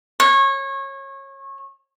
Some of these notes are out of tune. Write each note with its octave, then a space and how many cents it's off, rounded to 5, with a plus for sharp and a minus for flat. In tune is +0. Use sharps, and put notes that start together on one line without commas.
C#5 -25